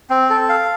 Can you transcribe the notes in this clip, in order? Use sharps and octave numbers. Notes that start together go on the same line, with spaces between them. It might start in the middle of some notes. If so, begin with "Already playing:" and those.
C4
A4
F5